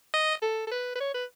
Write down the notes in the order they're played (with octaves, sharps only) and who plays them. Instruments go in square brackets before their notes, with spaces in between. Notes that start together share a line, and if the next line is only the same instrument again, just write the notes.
[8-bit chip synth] D#5
[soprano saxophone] A4
A4
B4
B4
C#5
B4